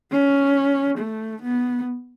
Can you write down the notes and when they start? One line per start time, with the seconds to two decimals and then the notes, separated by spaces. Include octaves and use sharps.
0.12 C#4
0.99 A3
1.42 B3